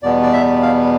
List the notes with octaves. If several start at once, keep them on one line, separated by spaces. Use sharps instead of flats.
E2 B2 G3 B3 D5
D5
E5
F5